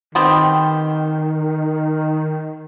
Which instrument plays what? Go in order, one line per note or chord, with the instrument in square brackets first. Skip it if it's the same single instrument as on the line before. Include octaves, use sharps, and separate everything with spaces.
[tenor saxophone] D#3 [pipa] B3 C4 G4